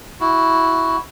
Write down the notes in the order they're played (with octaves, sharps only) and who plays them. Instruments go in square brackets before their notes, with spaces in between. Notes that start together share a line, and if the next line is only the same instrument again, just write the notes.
[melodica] E4 F#4